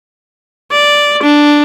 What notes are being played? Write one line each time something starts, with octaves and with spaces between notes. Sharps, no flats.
D5
D4